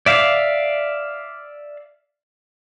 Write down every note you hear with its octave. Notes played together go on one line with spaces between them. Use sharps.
D5 E5 F5